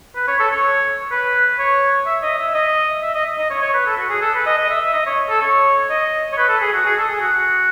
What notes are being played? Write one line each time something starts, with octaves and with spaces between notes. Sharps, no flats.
B4
C#5
A4
C#5
B4
C#5
E5
D#5
E5
D#5
E5
D#5
D#5
C#5
C#5
B4
A4
F#4
G#4
A4
B4
D#5
D#5
E5
E5
D#5
C#5
A4
C#5
D#5
C#5
B4
A4
G#4
F#4
G#4
A4
G#4
F#4